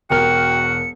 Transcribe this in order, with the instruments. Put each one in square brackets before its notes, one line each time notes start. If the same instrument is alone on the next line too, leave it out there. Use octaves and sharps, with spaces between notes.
[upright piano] E1 A#4 F6 [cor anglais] F#4 [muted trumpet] G5 [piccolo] C#7